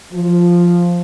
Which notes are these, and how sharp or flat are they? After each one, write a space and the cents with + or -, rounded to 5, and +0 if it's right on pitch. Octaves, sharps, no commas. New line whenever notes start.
F3 +0